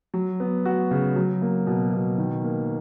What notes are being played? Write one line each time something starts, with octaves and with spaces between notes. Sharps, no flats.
F#3
B3
F#4
C#3
F#3
A#3
B2
B2
D#3
A#3